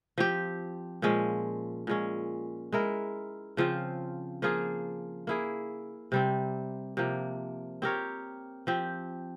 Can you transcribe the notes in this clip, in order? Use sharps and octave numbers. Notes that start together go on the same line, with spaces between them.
F3 C4 G4
A#2 F3 G#3 C#4
A#2 G#3 C#4
G#3 E4 A#4
C#3 F3 C4 F4
F3 A#3 F4 G#4
A#3 E4 G#4
C3 G3 C4
C3 F3 A#3
C4 G4 A#4 C#5
F3 C4 G4